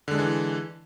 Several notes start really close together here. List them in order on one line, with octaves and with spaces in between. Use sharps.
D3 G#3 D4 E3